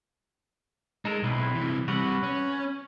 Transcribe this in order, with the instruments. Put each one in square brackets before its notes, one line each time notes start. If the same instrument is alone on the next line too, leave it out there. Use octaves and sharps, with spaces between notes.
[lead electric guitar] G#3 [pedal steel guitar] D#4 A4 A#4
[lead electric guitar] B1 [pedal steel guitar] C4 E4 B4
[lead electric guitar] C3 E3
[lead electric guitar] G3 C4 [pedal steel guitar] F#4 B4 F#5
[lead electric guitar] C#4